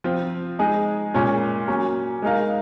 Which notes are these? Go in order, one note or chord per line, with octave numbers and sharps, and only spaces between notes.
F3 C4 F4
G#3 D#4 G#4
A#2 G#3 C#4 F4
F#3 A#3 C#4
G#3 D#4 A#4 F5